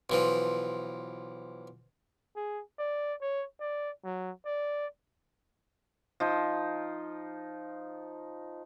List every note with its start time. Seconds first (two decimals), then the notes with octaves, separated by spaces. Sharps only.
0.10 B1 E3 F3
2.36 G#4
2.79 D5
3.22 C#5
3.60 D5
4.05 F#3
4.46 D5
6.20 F3 D#4